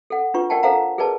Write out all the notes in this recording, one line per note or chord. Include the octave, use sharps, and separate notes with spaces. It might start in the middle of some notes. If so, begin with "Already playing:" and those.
A4 F#5
D4 F4 B4 C#6
A#4 D5 F#5 G5 A5
A4 C5 F5 F#5 A#5
G#4 A#4 B4 D5 A5